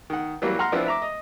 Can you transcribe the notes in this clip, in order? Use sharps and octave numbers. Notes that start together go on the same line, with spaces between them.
D#3 F#5
E3 F#3 G3 A#3
F#5 A#5 C6 F6
F3 B3 C4 D4 E4
E5 A#5 D6
D#5